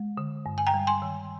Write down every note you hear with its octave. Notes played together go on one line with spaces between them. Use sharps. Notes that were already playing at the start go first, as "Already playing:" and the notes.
Already playing: G#3
D3
G2
G#5
G5 A#5
G3
G#5 C6
D#3